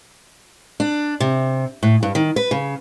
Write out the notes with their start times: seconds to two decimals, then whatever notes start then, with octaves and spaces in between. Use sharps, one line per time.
0.80 D4
1.20 C3
1.83 A2
2.03 G2
2.15 D#3
2.36 B4
2.51 C#3